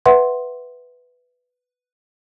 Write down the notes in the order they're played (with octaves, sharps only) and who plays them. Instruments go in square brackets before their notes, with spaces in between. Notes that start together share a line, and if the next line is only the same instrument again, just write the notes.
[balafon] B4 E5 F#5 C6